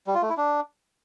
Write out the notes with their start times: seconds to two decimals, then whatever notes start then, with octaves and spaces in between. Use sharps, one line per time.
0.07 G3
0.14 F4
0.22 A3
0.30 E4
0.37 D4